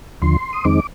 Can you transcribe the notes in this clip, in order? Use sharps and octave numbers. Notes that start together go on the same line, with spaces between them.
D#2 D3 F3 C6
D#6
F2 D#3 G#3 C4 D#4 D6